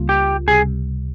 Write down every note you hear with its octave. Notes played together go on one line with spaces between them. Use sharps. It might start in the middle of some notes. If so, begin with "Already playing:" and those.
Already playing: C#2 C#3 G3 A#3 F4
G4
C#2 C3 G3 G#4